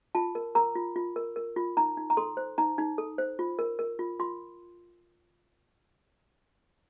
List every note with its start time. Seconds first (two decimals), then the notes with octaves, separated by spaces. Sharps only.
0.15 F4 A5
0.35 A#4
0.55 A#4 A#5
0.75 F4
0.96 F4
1.16 A#4
1.36 A#4
1.56 F4
1.77 D#4 A#5
1.97 D#4
2.10 A#5
2.17 A4 C6
2.37 C5
2.58 D#4 A#5
2.78 D#4
2.98 A4
3.18 C5
3.39 F4
3.59 A#4
3.79 A#4
3.99 F4
4.20 F4 C6